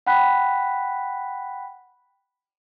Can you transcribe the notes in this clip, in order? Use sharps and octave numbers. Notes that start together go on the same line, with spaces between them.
F#5 G5 B5 F#6 B6